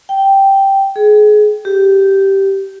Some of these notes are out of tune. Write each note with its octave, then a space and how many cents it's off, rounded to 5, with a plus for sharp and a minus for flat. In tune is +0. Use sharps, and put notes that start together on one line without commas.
G5 -5
G#4 +25
G4 -10